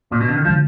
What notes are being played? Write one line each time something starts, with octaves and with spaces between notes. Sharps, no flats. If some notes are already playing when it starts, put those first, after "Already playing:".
A#2
B2
D3
D#3
D3 F3 G#3 D4